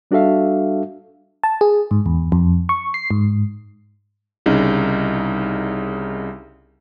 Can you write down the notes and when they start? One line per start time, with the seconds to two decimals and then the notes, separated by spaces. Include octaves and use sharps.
0.11 G3 D4 F#4 A4 E5 F5
1.44 A5
1.61 G#4
1.91 G#2
2.06 E2
2.32 F2
2.69 C#6
2.94 C7
3.11 G#2
4.46 C2 C#3 D#4